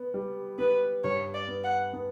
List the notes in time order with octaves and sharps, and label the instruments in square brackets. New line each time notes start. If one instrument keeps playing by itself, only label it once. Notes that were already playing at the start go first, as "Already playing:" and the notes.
Already playing: [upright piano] B3
G3
[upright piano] B3 [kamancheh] B4
[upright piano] G2 [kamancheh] C#5
[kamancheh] D5
[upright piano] B3
[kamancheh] F#5
[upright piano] B3